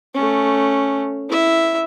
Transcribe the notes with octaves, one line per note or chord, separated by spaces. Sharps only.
A3 C#4
E4 E5